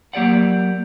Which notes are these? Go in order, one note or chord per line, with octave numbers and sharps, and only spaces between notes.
F#3 A#3 G4 D5 F#5